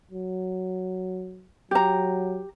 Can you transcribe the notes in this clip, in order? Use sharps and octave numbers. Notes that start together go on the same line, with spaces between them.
F#3
F#3 G4 A#5